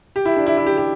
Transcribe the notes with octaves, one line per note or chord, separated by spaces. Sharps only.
G4
E4
D4
E4
E4
G4
G4